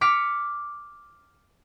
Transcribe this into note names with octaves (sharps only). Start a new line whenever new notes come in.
D6 F6 B6 C#7